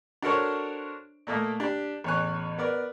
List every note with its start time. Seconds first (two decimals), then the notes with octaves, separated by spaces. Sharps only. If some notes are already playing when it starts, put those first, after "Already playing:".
0.22 D4 F#4 A4 A#4 C5 C#5
1.27 A#2 A3 A#3 D#5
1.60 D4 G4
2.04 A1 E2 C#5 G#5 F#6
2.58 B3 A#4 D5